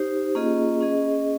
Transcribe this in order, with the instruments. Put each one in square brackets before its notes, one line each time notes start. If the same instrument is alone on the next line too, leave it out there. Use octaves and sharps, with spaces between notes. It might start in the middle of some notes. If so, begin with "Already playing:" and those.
Already playing: [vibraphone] D#4 G4 C5
A#3 C#4 F4 G#4 D#5
C#4 G#4 D#5